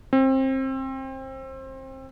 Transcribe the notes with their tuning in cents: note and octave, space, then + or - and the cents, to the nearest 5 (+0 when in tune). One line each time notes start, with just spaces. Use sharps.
C4 +25